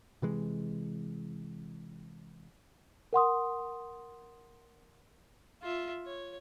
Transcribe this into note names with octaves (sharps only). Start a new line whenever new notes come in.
C3 E3 G#3
A#4 F#5 C6 D#6
F4 E5
C#5